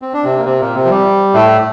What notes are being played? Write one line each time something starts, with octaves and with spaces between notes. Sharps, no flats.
C4
D4
C3 C4
A#3
C3 C4
A#2 A#3
C3 C4
F3
G3
A2 A3